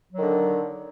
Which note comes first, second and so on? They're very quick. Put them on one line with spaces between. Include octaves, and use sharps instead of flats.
F#3 D#3 D3